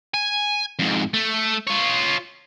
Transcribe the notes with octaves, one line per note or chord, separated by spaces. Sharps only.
G#5
F2 G#2
A3
F4 C#5